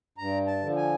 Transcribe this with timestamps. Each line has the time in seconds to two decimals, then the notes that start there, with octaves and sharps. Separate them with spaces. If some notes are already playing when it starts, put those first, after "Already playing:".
0.18 G2 A#5
0.47 A5
0.62 D3 F3
0.76 G#5